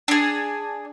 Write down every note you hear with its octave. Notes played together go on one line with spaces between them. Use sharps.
D4 G#4